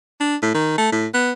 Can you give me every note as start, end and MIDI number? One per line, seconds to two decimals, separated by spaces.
0.20 0.36 62
0.42 0.51 45
0.54 0.77 51
0.78 0.91 57
0.92 1.07 45
1.14 1.32 59